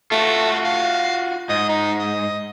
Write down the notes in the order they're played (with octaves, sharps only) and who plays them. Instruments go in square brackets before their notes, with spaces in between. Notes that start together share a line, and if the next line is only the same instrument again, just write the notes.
[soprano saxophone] A3 [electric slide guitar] F4 F#4
[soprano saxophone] F5
[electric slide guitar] G#2 [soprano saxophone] D#5
[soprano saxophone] D#4
D#5